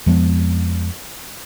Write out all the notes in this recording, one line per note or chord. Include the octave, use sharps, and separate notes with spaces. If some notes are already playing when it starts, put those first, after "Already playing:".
F2 F3 G#3 B3